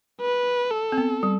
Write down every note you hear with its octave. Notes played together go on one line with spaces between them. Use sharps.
B4
A4
C4
B3
G3